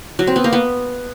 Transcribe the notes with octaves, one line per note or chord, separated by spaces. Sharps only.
F#3
C4
B3
A#3
B3